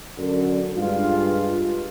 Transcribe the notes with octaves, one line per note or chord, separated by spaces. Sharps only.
F#2 D3
G2 G#3 F4